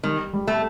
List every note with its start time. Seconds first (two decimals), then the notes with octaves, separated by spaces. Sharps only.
0.04 D#3 G3
0.33 G3
0.48 A3